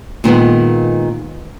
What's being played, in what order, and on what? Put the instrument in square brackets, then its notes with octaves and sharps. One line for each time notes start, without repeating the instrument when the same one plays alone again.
[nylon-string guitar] A#2 D#3 G#3 B3